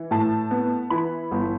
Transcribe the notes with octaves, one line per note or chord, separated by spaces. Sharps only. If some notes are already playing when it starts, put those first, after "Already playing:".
Already playing: E3
A2 A5
B3
E3 B5
G1